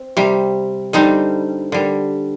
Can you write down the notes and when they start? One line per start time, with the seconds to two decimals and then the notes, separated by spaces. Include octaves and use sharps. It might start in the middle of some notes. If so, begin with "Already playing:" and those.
Already playing: C4
0.17 C3 G3
0.93 D3 G3 C4 D#4
1.72 D3 G3